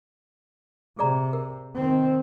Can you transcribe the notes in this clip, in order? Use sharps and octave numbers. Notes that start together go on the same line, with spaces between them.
C3 G#4 D5 A#5
A#4
D#3 C4